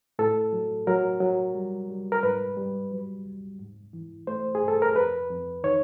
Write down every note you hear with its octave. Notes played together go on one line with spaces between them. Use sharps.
A2 A4
F#3
F#3 A#4
F#3
G3
G3
A#4
G#2 B4
G3
F#3
D#2
G#2
E3
A3 C5
G#4
G2
A4
A#4
F2 B4
F2
D#3 C#5